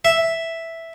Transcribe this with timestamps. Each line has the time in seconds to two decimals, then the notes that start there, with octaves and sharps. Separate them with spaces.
0.05 E5